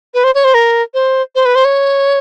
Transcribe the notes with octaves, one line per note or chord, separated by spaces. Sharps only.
B4
C5
C#5
C5
A#4
C5
C5
B4
C5
C#5